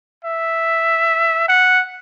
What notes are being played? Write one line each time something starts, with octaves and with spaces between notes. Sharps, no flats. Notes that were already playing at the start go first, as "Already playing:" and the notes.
E5
F#5